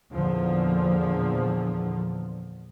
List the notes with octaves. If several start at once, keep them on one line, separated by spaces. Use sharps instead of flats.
E2 A#2 D3 F3